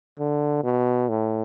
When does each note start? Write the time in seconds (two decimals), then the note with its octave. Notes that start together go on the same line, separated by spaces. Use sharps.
0.19 D3
0.64 B2
1.09 A2